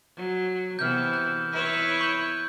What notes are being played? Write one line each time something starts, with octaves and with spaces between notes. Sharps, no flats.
F#3
C3 E3 B3 F6 G6
F#6
E4 B4 C#5
C#6 G6